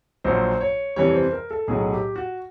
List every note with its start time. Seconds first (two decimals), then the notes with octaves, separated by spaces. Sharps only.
0.24 A#1 A#2 F#3 C5
0.61 C#5
0.96 F2 C3 E3 G3 C#5
1.14 C5
1.33 A#4
1.51 A4
1.68 B1 A2 F#3 G#4
1.93 G4
2.16 F#4